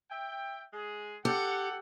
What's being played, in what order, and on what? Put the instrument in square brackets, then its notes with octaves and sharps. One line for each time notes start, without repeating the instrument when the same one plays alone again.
[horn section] E5 G5
G#3 G#4
[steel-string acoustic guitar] G4 [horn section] A4 F#5